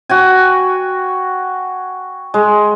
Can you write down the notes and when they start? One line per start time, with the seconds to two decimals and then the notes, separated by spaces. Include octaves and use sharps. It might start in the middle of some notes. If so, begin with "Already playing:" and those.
0.09 F#4 G5 G#5
2.34 G#3